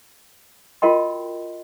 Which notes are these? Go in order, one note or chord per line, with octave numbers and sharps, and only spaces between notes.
F4 F#4 A#4 D#5 G5 C6